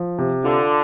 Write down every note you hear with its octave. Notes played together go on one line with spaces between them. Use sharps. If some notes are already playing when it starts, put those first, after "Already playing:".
Already playing: F3
C3
D3 F4